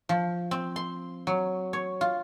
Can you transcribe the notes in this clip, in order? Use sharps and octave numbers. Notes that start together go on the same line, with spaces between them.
F3
C4
C6
F#3
C#5
F4